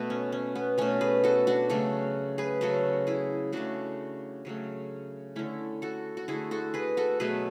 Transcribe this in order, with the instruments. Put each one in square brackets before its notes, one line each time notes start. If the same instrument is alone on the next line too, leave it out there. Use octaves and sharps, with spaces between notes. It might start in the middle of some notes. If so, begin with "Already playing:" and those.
Already playing: [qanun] B2 A3 B3
C#4
C#4
B3
B2 A3 C#4
G#4 B4
F#4 A4
D4 F#4
C#3 F#3 A3 F#4 A4
G#4 B4
C#3 F#3 A3 F#4 A4
E4 G#4
C#3 F#3 A3 D4 F#4
C#3 F#3 A3
D3 A3 C#4 E4
F#4 A4
F#4
D3 A3 E4 G#4
F#4 A4
G#4 B4
F#4 A4
B2 F#3 A3 G#4 B4